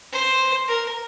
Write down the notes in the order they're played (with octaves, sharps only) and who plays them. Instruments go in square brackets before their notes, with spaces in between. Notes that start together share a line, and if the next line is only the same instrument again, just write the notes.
[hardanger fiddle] C5
A#4